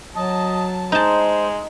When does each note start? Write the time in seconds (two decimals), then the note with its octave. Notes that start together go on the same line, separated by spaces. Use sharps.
0.16 F#3 D#5 A5
0.92 G#3 D#4 C5 A5